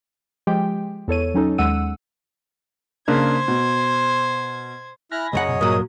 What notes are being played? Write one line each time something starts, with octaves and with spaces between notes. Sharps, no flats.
F3 G#3 G4 G5
E2 A4 C#5 D#7
F#3 C#4 D#4 A4
D#2 G#3 F#5 E6 D#7
C#3 A#3 D4 C5 G#6
B2
E4 G#5 B5 F6 F#6 A#6
C#2 F#2 G#4 C#5 D#5 F#5
B2
G2 A#2 F#3 A#4 D#6